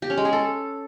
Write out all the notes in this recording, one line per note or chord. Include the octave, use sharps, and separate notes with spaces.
G4
C#4
G#3
G#4
A4